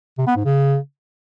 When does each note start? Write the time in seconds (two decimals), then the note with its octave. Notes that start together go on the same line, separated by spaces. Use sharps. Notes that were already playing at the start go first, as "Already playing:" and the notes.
0.18 C3
0.27 B3
0.36 G#2
0.45 C#3